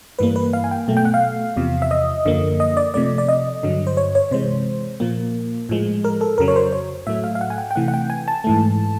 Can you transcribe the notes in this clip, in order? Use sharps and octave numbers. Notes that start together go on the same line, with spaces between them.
G2 E3 G3 A#3 B4
B4
F5
G#5
G5
B2 F#3 A3
G5
F#5
F5
E2 C3 F3
E5
D#5
F#2 D3 F3 A#3
D#5
D5
C3 F3 A3 D5
D5
D#5
G2 D3 F#3
C5
C#5
C#5
C3 E3 G#3 C5
A#2 F3 A#3
A2 F3 G#3
A#4
A4
F2 C#3 F#3 A#4
C#5
C5
C#5
A2 F#3 A3 E5
F5
F5
F#5
G#5
G5
G5
C3 E3 A3 F#5
F#5
G5
G#5
A5
G#2 E3 A3